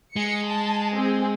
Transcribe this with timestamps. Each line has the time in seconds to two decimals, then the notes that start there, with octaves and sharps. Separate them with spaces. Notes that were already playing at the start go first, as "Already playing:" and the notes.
0.16 G#3 C#7
0.47 A5
0.95 C4 G#4